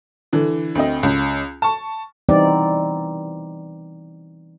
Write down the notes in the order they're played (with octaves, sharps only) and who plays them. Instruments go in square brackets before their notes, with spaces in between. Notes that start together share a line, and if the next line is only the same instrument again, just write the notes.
[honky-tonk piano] D3 E3
D2 C4 D#5
C#2
A5 C#6
[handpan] E3 G3 B3 C4 D#4 D5